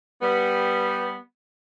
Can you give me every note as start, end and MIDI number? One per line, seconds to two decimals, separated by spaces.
0.21 1.17 55
0.21 1.17 59